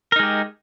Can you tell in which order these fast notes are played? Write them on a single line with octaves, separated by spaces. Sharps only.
A#4 D#4 G#3 G4